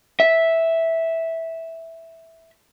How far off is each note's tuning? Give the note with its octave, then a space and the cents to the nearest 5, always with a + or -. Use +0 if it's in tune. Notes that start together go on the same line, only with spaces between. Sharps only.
E5 -5